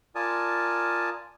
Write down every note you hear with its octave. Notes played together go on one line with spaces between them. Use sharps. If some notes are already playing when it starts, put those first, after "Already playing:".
F4 A#4 D5 G#5 A5 D#6